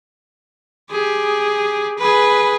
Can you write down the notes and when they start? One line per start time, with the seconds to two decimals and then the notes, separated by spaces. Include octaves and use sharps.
0.91 G4 G#4
1.98 G#4 B4